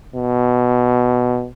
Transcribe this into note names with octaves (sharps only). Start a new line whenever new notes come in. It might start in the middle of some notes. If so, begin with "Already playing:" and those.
B2